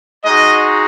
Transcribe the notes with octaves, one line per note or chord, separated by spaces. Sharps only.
G#3 D#4 F#4 D#5